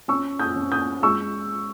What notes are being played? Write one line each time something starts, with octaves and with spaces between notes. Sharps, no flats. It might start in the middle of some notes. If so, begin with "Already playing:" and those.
C#4 C#6 E6
D#6 G6
C#4
D#6 G6
G#3 C#6 E6